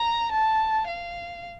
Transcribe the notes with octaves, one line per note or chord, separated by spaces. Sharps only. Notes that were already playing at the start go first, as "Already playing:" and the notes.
Already playing: A#5
A5
F5